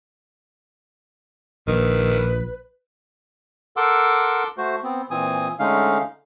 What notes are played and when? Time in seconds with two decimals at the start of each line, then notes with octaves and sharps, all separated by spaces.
1.68 A#1 D#3 B4
3.77 A4 A#4 F#5 C6 D6 E6
4.58 A3 F#4 C5
4.83 B3 C4
5.10 A#2 E3 C4 G#5 D#6
5.59 D3 G#3 A3 C#4 D#4 F5